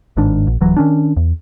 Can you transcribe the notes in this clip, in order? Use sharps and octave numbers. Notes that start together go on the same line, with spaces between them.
G1 G#2 D#3 D4
A#1
D1 E3 F#3
D#3 C#4 D4
E2